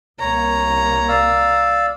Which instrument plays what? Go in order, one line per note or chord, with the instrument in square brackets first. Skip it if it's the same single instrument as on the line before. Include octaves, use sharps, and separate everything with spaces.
[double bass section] C2 A#3 [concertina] C#5 [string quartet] A#5
[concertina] D5 F5 E6